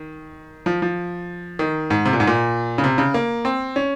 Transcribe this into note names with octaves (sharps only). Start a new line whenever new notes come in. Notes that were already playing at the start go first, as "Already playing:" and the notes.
Already playing: D#3
F3
F3
D#3
G#2
C3
A#2
G#2
A#2
C#3
C3
C#3
A#3
C4
C#4